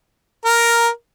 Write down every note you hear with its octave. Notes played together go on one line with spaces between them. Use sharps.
A#4